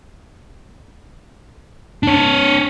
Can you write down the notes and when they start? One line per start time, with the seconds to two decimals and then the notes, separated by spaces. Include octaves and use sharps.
2.03 D4 C#5